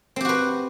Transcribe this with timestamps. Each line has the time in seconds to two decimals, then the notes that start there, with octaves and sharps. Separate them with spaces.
0.16 C4
0.21 G4
0.25 F#4
0.29 B4